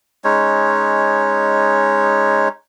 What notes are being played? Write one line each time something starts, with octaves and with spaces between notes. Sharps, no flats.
G#3 C#4 D#4 C#5